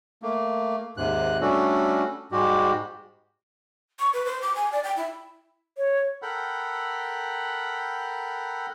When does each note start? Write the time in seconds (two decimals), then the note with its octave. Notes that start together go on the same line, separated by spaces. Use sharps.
0.22 A3 A#3
0.97 D#2 G#2 C3 F#6
1.41 G3 A3 C#4 D4 F#4 A4
2.32 G#2 G3 G#3 F#4 G4
3.99 C#6
4.13 B4
4.25 C5
4.42 D6
4.55 G#5
4.72 D5
4.84 G5
4.97 E4
5.77 C#5
6.22 A4 A#4 F#5 G5 B5